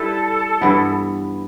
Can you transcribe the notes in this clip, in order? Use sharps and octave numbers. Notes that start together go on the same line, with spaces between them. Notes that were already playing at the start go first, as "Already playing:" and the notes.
Already playing: G3 E4 G4 A4 B4
G2 E3 B3 E4